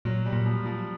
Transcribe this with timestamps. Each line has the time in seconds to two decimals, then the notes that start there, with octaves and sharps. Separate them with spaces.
0.05 A#2 F#3
0.26 G3
0.33 A#2
0.46 F3
0.65 F3